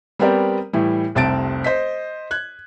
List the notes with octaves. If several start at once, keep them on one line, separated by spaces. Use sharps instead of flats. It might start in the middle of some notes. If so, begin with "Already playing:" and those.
G3 B3 C4 G4 A#4 D5
A2 E3 G3
F1 C2 C4 A5 A6 D7
C5 D#5 B6
F#6 G#6